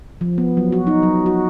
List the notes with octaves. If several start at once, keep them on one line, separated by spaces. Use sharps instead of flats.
F3
B3
F#3
F#4
D#4
F#3
F#4